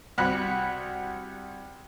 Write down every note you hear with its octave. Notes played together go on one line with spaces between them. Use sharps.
C2 F#4 B5 F#6